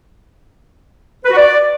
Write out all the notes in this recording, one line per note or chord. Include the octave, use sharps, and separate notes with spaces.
B4
F#4
D5